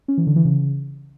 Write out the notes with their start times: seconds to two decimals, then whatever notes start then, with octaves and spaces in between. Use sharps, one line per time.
0.08 C#4
0.18 E3
0.27 D3
0.36 E3
0.45 C#3